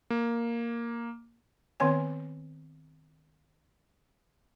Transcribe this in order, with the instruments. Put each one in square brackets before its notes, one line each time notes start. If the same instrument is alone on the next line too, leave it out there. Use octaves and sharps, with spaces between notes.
[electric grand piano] A#3
[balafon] D#3 B3 C4 C#5 G#5